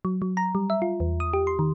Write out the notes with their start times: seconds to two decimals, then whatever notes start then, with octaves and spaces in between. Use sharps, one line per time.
0.05 F#3
0.22 F#3
0.37 A#5
0.55 G3
0.70 E5
0.82 F4
1.00 E2
1.20 D#6
1.33 G4
1.47 C6
1.59 D#3